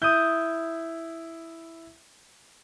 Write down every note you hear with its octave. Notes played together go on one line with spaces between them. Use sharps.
E4 D#6 G6